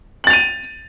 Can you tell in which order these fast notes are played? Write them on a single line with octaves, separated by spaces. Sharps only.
F#7 A6 F7 D#7